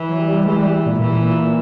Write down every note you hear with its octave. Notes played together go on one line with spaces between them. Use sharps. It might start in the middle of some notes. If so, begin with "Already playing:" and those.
Already playing: E3
F#3
G3
E3 G#3
G3
A#2
A#2 E3